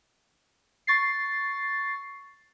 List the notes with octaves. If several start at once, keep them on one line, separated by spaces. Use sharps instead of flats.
C#6 A6 C7